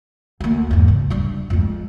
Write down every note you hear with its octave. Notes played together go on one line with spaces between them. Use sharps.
D2 A#3
E2 G#2
C#3
G3 D4
F2 G#3